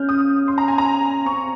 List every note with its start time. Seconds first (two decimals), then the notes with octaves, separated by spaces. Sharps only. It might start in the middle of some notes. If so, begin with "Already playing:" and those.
Already playing: C#4 F6 G6
0.09 D#6
0.48 C6
0.58 A#5
0.68 G#5
0.78 A#5
1.26 C4 C#6